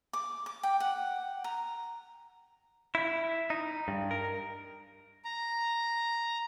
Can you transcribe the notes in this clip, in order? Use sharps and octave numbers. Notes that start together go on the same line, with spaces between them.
D6
D6
G5
F#5
A#5
E4
D#4
G2
A#4
A#5